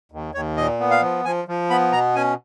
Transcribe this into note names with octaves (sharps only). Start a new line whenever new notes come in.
D#2
D#2 C#5
A#2 D#5
B3
F5
F3
F3 G#5
F3
B3 B5
B2 A#5
C#4 G#5